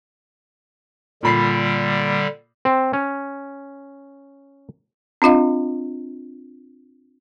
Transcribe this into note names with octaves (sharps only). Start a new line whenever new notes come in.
A#2 D3 G3 B5 C7
C4
C#4
C4 D4 F4 D#5 F5